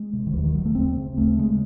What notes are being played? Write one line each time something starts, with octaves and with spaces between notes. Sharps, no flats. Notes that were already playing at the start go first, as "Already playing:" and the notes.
Already playing: G#3
C3
D#3
D#2 E3
D#3
C#3 F#3
A3
D#2 C4
C#3
D#2 A3
C#3 G#3